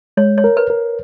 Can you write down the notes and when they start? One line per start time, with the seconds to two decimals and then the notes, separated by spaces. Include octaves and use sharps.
0.17 G#3 C#5
0.38 C#5
0.44 A#4
0.57 B4
0.70 A#4